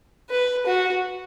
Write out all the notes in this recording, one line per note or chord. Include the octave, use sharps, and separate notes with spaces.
B4
F#4